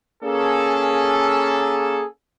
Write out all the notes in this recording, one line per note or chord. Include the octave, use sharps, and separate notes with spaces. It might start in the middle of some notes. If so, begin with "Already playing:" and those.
A#3 C#4 G#4 A4